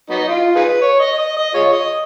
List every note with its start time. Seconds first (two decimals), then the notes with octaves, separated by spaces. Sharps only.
0.10 F#3 B3 D#4
0.28 F4
0.55 D#4 G#4 B4
0.82 C#5
1.00 D#5
1.18 D#5
1.36 D#5
1.54 F4 G#4 C#5
1.73 D#5